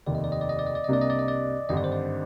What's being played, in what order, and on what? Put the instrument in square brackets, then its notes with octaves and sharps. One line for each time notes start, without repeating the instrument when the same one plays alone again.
[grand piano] F1 D#2 D#3 [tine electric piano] D5
[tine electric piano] D#5
D5
D#5
D5
D#5
D5
D#5
D5
D#5
[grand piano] C2 C3 G3 A#3 D4 [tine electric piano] D5
[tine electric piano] D#5
D5
D#5
D5
[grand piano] G#1 G2 D3 [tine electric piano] D#5
[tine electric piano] D5
C5
D5